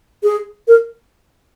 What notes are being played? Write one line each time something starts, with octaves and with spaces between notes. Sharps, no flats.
G#4
A#4